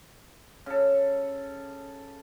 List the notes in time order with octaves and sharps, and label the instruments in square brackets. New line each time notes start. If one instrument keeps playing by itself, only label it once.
[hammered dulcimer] C#3 A4